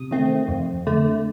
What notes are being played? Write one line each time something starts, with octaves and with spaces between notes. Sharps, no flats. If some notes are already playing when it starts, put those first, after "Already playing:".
Already playing: C3 D#6
D#3 A3 C4
F2
D3 A3